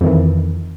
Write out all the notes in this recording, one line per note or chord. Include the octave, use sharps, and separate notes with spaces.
F2 D#3 E3